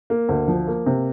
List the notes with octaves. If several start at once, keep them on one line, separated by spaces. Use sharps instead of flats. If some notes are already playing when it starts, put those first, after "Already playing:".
A#3
D2
F3
A#3
C3